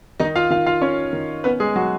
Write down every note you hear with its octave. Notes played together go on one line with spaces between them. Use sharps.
D#3 D#4 D#5
F4 F5
D#3 F4 F5
F4 F5
C#4 C#5
D#3
B3 C#4 B4
G#3 G#4
F#3 F#4